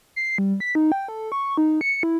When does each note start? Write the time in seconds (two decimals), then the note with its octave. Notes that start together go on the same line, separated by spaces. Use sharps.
0.16 C7
0.38 G3
0.60 B6
0.75 D#4
0.92 G5
1.08 A4
1.32 C#6
1.58 D#4
1.81 C#7
2.03 E4